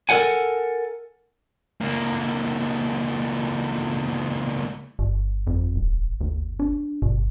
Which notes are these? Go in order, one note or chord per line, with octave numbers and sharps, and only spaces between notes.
A4 A#4 C5 C#5 F#5 G#5
C#2 A#3
G1
F2
D#1
D#2
D4
G1 B2